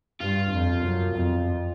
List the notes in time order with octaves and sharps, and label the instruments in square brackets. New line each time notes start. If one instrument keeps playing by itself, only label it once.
[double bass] G2 [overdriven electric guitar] F4
[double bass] F2
F#2
F2